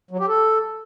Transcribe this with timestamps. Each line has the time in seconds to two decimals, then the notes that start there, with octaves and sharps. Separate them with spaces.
0.11 F#3
0.19 G4
0.28 A4